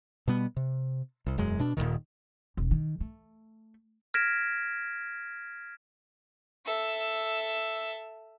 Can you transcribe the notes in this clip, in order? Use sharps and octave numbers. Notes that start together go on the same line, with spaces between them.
B2 G3 B3
C3
C2
E1 F#2 G#3
B2 D4
D#1 C#2 A#2 D#3
E1
D#3
A3
F6 G#6 A#6 B6 D7 E7
A4 E5